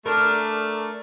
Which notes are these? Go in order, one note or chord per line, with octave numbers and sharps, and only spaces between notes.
A3 D4 A#4